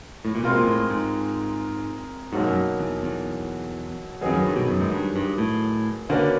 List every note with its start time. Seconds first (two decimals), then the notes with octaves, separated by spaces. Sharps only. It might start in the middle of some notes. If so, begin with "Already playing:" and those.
0.25 A2
0.35 A#2
0.43 B2 G#3 C4 F4 A#4
0.56 A#2
0.67 A2
0.90 G#2
2.32 G#2 B2 F#3 A#3 D#4 F#4
2.48 F#2
2.79 E2
3.03 E2
4.21 F2 D#3 F#3 B3 D#4 G#4
4.33 F#2
4.45 G2
4.56 B2
4.68 F#2
4.81 G#2
4.92 G2
5.16 G2
5.38 A2
6.09 D3 A#3 C#4 F#4 B4 D5